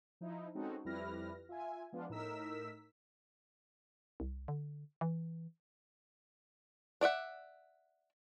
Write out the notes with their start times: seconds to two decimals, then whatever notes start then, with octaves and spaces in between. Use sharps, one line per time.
0.21 F3 D#4 E4
0.55 G#3 C4 C#4 D#4 F#4 A4
0.85 F2 G3 E4 B4 F6 A#6
1.49 F4 E5 G#5
1.92 F3 G#3 B3 D4 F4
2.09 A2 D#4 A#4 E6 B6
4.20 C2
4.48 D3
5.01 E3
7.01 D4 D5 E5 F#5